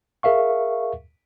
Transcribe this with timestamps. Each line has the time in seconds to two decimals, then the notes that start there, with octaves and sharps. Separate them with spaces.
0.23 G#4 A#4 E5 F5 C#6